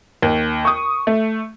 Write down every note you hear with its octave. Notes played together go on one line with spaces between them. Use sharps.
D#2
C#6 D#6
A3